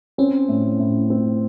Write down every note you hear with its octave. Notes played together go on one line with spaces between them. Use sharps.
C4 C#4
A2
A2
C4